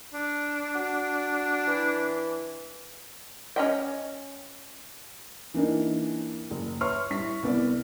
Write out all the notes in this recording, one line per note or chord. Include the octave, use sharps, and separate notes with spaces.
D4
F#4
E3
C#4 D#5 G5
E3 A#3 D4 D#4
F#1
B4 C#5 E5 C6 C#6 F6
G3 E4 C#6 B6
C2 B3 D5